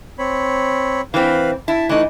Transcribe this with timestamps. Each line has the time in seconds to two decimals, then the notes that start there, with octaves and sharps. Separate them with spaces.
0.19 C4 C#5 B5
1.14 E3 C4 B4 F5 B5
1.68 E4 A5
1.89 E3 A3 D#4 F#6